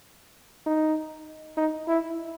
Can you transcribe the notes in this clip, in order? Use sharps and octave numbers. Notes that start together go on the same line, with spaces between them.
D#4
D#4
E4